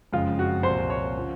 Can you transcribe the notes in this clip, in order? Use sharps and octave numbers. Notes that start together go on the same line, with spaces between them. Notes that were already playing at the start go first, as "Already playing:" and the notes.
F#1 F2 C#3 G#3 C4 F4
F#4
C2 A#2 F3 C5
C#5
C#3 F3